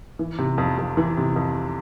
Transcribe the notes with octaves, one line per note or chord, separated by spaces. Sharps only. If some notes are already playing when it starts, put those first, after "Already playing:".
E3
C3
F2
F2
E3
C3
F2